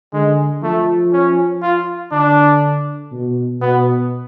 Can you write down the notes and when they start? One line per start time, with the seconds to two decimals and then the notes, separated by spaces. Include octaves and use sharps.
0.13 D3 G#3
0.63 F3 A3
1.13 C#4
1.62 F4
2.12 D3 D4
3.12 B2
3.61 B2 B3